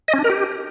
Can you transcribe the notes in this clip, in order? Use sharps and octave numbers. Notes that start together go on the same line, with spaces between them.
D#5
C#4
D4
A#4
G4